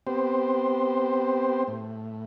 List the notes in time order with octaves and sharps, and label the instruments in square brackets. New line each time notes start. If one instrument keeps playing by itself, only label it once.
[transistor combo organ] B3 C4 G4 C5
A2